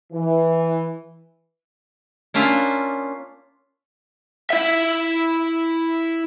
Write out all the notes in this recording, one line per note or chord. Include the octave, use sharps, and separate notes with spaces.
E3
A#3 C#4 D4 F4 E5
E4 E5